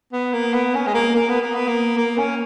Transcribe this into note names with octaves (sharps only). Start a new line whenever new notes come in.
B3
A#3
B3
C#4
G#3
A#3
A#3
B3
A#3
B3
A#3
A#3
C#4